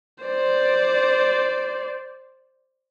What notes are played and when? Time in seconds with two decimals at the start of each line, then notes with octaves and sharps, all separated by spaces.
0.24 C5 D5